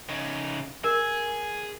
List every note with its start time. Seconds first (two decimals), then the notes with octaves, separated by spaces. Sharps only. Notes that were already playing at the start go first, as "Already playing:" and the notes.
0.09 C#3 D#4
0.84 G#4 A#4